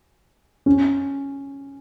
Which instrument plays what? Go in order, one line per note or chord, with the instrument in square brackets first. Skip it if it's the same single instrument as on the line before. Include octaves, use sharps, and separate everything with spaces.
[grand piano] C#4